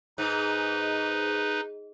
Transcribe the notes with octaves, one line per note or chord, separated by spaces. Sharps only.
G#2 D#4 B4